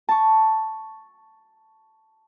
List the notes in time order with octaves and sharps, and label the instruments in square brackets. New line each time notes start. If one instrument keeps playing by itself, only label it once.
[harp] A5 C#6